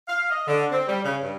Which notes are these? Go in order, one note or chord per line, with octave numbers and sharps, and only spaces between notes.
F5
D#5
D3
C4
G3
C#3
G2